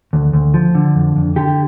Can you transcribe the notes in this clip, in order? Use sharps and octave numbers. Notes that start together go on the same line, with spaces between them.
D2
D2
F3
D3
F2
F2
D3 G4